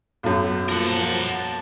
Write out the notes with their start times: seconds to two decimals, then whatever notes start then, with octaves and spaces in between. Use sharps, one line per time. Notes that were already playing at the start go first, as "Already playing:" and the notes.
0.23 B1 F#2
0.69 F3 A#3 A#4 F#5 A5
1.09 A5